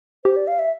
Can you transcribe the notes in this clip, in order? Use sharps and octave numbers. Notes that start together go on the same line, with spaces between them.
G4 C5
D5
F5
E5